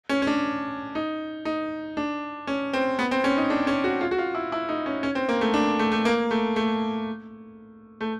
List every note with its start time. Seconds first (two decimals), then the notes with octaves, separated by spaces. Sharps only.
0.09 C#4
0.22 C#4
0.27 D4
0.95 D#4
1.45 D#4
1.97 D4
2.47 C#4
2.73 C4
2.99 B3
3.11 C4
3.24 C#4
3.37 D#4
3.50 D4
3.67 C#4
3.84 F#4
4.01 F4
4.11 F#4
4.18 F4
4.35 E4
4.52 E4
4.69 D#4
4.86 C#4
5.03 C#4
5.15 C4
5.29 A#3
5.41 A3
5.54 D4
5.79 A3
5.92 A3
6.05 A#3
6.31 A3
6.56 A3
8.01 A3